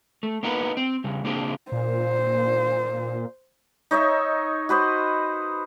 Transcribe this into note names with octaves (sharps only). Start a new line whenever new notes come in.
A3
A#3 B3 D#4 A#4 B4
C4
C#3 G3
C#3 A#3 C4 D4 G#4
A#2 C5
D#4 C#5 D#5 E5
F#4 B4 C5 D#5